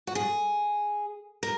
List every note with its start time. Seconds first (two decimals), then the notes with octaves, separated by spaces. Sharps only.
0.07 F#4
0.15 G#4
1.43 A#4